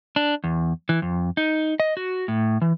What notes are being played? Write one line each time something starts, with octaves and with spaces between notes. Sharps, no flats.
D4
E2
E3
F2
D#4
D#5
F#4
A2
E3